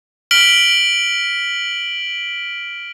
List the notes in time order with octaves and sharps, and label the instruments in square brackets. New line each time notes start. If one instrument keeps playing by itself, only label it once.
[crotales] F6 B6 D7 F#7 G7